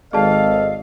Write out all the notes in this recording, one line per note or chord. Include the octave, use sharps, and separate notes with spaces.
G#1 G#4 A4 D5 D#5 F5 A5